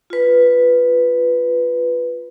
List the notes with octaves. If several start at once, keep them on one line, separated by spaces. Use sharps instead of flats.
F4 B4